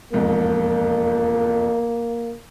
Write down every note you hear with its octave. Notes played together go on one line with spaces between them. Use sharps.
E1 F2 G#2 A#3